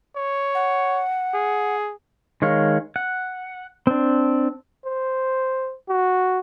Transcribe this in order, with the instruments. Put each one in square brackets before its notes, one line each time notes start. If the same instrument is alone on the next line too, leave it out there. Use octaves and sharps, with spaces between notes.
[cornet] C#5
[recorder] F#5
[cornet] G#4
[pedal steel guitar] D#3 G#3 C#5 F5
F#5
C4 D4
[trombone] C5
F#4